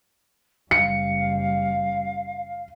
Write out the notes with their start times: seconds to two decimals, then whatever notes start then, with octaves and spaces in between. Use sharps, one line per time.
0.71 F#1 G3 F5 C#7